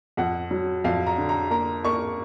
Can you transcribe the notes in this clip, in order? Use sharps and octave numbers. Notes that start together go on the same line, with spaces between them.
F2 F#5
F#3
F2 F5
A#5
D3
A#5
A#3 A#5
A#3 C#6